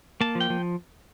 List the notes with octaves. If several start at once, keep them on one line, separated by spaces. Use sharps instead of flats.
A#3 A5
F3
G5
F3